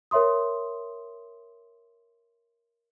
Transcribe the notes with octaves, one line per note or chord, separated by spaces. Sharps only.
A#4 C#5 E5 C6 D#6